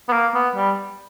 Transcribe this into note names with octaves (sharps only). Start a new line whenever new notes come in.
B3
A#3
B3
G3